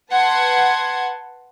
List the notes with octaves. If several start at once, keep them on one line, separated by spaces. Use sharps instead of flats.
B4 F#5 A5 C6 G#6